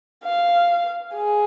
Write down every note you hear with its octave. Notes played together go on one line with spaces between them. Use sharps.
F5
G#4